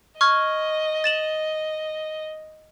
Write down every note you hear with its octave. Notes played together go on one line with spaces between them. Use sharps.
D#5 C#6 F6 G#6
A6 E7 F#7